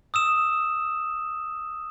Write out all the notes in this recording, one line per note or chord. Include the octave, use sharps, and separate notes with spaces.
D#6 E6 E7